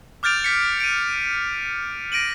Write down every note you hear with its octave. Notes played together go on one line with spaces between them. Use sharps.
D6 F6 G6 A6 D7 F7
G6 B6 C#7
D7 D#7
A#6 D7 D#7 F#7